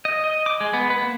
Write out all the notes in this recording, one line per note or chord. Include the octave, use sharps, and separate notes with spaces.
D#5
D#5
D6
G#3
B3
B4
A#3